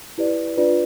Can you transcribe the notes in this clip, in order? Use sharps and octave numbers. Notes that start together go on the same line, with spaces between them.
E4 G4 B4 D5
D4 F4 B4 D5